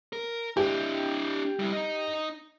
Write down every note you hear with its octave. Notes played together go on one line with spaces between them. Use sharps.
A#4
D4 E4 G4
G3 E4
D#4 D#5